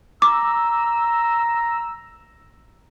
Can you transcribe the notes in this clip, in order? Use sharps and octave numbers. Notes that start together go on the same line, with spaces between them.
A#5 D6 E6